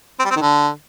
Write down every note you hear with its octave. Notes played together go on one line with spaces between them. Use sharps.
C4
G3
C4
D#3
D3